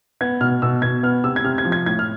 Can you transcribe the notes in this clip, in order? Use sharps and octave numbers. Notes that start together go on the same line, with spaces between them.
B3 G#6
B2 F6
B2 E6
B2 G#6
B3 F6
C3 E6
G#6
C3 F6
G#6
F3
G#6
A2 G#6
F6